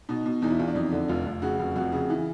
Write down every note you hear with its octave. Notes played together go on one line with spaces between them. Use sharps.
B2 D#4
B2
E2 D#4
E4
E2 F4
D4
F2 D#4
D3
F1 F4
F1
C#3 F#4
F1
F2 F#4
C#3
E3